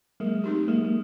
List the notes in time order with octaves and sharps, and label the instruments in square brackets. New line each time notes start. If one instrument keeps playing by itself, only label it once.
[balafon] F#3 [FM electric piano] G#3 A#3
[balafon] A3 C4 D#4 G4
[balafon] F#3 [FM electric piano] G#3 A#3
[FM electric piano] G#3 A#3